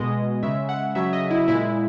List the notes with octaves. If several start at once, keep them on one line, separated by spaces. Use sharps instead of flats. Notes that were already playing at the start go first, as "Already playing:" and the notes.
Already playing: B2 G#3 D#5
C#3 G#3 E5
F#5
C#3 F#3 E5
D#5
E4
A#2 G#3 E4